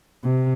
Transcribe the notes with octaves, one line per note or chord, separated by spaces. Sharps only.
C3